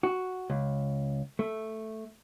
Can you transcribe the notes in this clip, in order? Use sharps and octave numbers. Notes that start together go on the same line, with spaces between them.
F#4
C#2
A3